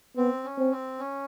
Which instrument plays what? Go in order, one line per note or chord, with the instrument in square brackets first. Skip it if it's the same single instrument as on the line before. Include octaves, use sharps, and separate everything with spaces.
[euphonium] B3 [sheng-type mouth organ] C4
[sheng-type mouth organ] C#4
[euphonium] C4
[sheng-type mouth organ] C4
C#4